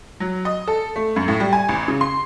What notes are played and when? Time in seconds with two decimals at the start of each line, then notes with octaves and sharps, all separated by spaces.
0.20 F#3
0.45 D#5
0.68 A4
0.96 A3
1.16 F#2
1.28 A2
1.40 G3
1.53 G#5
1.68 A1
1.88 C#3
2.01 C6